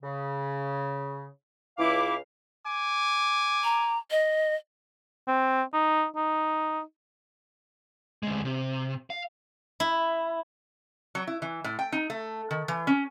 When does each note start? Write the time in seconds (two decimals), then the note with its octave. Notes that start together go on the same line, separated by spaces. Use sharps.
0.02 C#3
1.78 C#2 E4 F5 D6
2.66 G#5 D6
3.64 A#5
4.11 D#5
5.27 C4
5.73 D#4
6.16 D#4
8.23 D2 G#3
8.45 C3
9.10 F5
9.80 E4
11.15 F#3
11.27 E4
11.42 E3
11.64 A2
11.79 G5
11.92 D#4
12.10 A3
12.51 D#3
12.68 E3
12.87 C#4